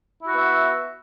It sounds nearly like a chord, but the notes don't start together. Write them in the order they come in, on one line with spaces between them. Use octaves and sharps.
E4 F#4 B3 E5